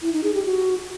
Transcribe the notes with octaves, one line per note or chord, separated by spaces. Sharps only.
E4
D#4
G#4
G4
F#4